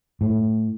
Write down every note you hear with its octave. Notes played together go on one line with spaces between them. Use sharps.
A2